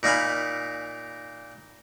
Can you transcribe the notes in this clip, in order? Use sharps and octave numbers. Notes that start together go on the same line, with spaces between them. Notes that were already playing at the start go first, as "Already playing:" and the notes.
A#2 D#4 F5 G#5 B5